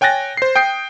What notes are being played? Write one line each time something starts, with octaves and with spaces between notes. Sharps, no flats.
C#5 G5 G#5 F#6 A6 A#6
C5 C7
G5 D#6 G6 C7